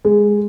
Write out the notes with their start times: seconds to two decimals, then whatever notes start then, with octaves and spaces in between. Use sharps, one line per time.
0.05 G#3